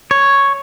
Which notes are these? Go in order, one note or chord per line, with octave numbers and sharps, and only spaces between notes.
C#5